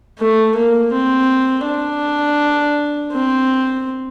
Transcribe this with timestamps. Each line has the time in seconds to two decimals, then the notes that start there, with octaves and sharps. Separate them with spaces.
0.19 A3
0.55 A#3
0.93 C4
1.66 D4
3.12 C4